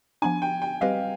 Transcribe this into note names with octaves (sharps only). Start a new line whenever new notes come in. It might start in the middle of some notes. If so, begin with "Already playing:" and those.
F3 B3 D4 G#5
G5
G5
G3 C4 G4 B4 D#5 F5